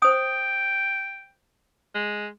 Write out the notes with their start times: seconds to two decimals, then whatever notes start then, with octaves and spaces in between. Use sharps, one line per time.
0.02 C5 G5 D#6
1.95 G#3